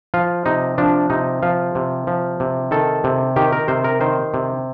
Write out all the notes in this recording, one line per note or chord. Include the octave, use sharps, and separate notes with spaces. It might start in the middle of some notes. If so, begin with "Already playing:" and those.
F3 F4
C3 D#4
F3 D4
C3 D#4
F3 F4
C3
F3
C3
D#3 A4
C3
D#3 G4
A#4
C3 C5
A#4
D#3 C5
C3